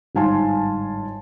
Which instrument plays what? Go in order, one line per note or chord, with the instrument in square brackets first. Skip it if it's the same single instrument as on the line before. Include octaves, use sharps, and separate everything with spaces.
[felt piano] G1 G#2 F5 G#5 A5 C6